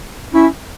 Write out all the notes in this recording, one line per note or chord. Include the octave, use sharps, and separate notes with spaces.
C#4 E4